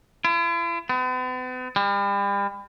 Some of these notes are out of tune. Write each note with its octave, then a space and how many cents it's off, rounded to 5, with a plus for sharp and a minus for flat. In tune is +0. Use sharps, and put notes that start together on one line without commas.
E4 +45
B3 +45
G3 +35